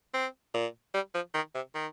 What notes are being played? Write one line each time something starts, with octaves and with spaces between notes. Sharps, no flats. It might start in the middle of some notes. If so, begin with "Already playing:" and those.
C4
A#2
G3
F3
D#3
C3
D#3